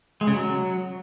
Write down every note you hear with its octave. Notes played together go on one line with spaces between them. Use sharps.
G#3
C#3
F#3